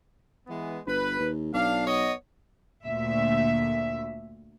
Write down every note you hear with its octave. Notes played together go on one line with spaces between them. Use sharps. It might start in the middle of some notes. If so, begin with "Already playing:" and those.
E3 G#3 B3
G1 B4
D#2
B1 D4 F5
B3 C#5 D#5
D2 A#2 E5